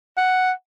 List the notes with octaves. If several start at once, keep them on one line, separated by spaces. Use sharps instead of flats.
F#5